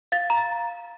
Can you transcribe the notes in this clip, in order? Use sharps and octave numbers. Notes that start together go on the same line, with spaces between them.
F5 A6
A#5